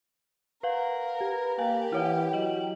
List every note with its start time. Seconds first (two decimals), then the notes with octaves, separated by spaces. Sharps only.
0.63 A#4 B4 F5 F#5
1.21 G4 B4
1.58 A#3 G4 F5 G5 G#5
1.92 E3 E4 C#5 F#5
2.33 F#3 D#5 F#7